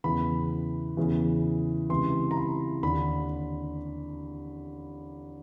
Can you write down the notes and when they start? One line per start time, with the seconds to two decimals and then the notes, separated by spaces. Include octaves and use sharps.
0.04 E2 C#3 E3 B5
0.97 E2 C#3 E3
1.90 C#2 C3 E3 C6
2.31 A#5
2.37 B5
2.83 D#2 D3 B5